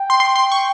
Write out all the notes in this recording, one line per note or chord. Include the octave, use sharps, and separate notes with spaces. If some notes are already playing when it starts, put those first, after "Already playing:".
Already playing: G5
C6
C6
C6
C#6